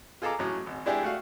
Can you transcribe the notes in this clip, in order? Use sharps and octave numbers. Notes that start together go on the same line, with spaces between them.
F4 G#4 A4 A5 A#5 D6
A2 F#3 C#4
G#1
G#3 D4 E4 G4 G#4
A3 F#4 F5